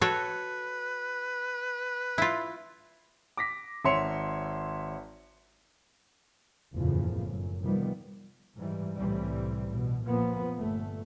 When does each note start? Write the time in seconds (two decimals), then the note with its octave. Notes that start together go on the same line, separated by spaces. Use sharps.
0.01 F#4 A4 B4 C#5
2.18 E4 F4
3.37 D6 A#6 B6
3.85 G#1 C#5 E5 C6 C#7 F7
6.75 F#1 E2 A2 C#3 F3
7.29 F#2
7.63 C3 D#3 F3 G3 B3
8.56 G#2 E3 G3
8.96 C2 A2 C3 E3 G3
9.74 B2
10.03 A#2 F3 A#3 B3
10.57 G1 A3